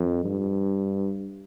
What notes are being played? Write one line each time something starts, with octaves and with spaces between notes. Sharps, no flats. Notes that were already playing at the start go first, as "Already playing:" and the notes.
Already playing: F2
G2